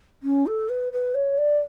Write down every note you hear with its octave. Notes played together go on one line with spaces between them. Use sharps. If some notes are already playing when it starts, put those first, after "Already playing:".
C#4
A4
B4
B4
C#5
D5